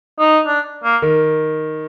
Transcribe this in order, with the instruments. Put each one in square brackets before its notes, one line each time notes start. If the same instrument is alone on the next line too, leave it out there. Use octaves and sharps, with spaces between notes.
[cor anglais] D#4
D4
A#3
[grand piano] D#3